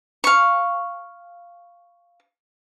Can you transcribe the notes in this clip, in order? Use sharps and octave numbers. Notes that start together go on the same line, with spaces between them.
F5 C#6